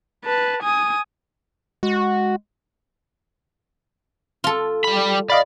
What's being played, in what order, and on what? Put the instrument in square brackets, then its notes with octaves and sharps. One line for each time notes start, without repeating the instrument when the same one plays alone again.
[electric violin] B4 A5
G#5 D#6
[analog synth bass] G#3 [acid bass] F#4
[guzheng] F4 A4
[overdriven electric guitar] G3 B5
[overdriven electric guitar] D5 [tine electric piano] D#5 F5 B5